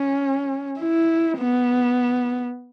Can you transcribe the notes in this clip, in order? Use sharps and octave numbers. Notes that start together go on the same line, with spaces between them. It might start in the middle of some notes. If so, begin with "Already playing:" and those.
Already playing: C#4
E4
B3